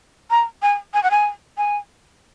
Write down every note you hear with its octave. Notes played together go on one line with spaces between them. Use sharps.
A#5
G#5
G#5
F#5
G#5
G#5